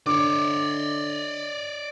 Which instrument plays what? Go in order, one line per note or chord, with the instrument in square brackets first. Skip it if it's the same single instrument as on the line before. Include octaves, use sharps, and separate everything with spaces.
[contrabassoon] D3 [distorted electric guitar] C#5 D5 [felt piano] D6